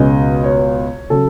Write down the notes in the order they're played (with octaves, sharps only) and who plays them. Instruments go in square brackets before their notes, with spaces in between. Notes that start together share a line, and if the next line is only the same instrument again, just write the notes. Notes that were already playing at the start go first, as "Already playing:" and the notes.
Already playing: [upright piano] C#2 B2 G#3 C#4 D#5
C#5
C#3 F#3 A4